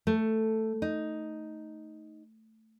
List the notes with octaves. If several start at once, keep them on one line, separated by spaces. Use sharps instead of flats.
A3
D#4